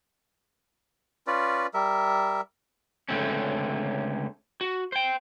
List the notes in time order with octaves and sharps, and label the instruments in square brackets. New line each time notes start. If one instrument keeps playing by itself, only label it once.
[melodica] C#4 F4 B4 D5
G3 A#4 E5
[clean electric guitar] C#2 G2 D3 A3 C4 C#4
F#4
C5 G5